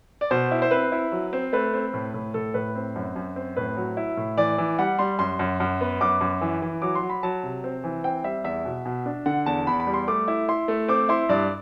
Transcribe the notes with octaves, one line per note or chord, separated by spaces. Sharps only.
D5
B2 C5
E4
C5
C4 B4
E4
F#3
C4
A3 B4
C4
A2
A2
A2 A4
A2 B4
C4
F#2
F#2
C4
A2 B4
F#3
E4
A2
E3 D5
E3
G3 F#5
G3 C6
F#2 C6
F#2
F#2
B3
F#2 D6
F#2
E3
E3
F#3 D6
C6
F#3
B5
F#3 A5
C3
C4
E3
C4 G5
G3 E5
E2 E5
B2
B2
D4
D3 F#5
E2 A5
E2 B5
B5
G3
C6
A3 D6
E4
E4 C6
A3
C4 D6
E4 C6
G2 D5